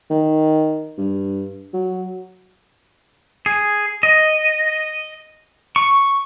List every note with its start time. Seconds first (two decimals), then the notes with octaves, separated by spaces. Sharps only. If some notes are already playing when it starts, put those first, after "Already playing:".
0.10 D#3
0.98 G2
1.74 F#3
3.46 G#4
4.03 D#5
5.76 C#6